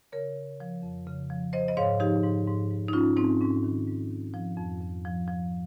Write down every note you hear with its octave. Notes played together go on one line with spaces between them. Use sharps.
C#3 A#4 C#5
C#3
F3
F2
C#3
F3
F3 C5 D#5
D#5
G#2 C#5 F5
F3 D#4 G4
G#2
G#2
G#2
D#4
G#2 C#4 F4
G#2 C4 D#4
G#2 C#4
D#3
G#2
D#3
F3
F2
F2
F3
F3